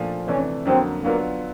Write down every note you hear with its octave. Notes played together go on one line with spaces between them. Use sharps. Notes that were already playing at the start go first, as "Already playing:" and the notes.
Already playing: A#2 F3 A3 D4 F4
C3 E3 A3 C#4 D4
F2 D3 F#3 A#3 C4
D3 F#3 A#3 B3 D4 F4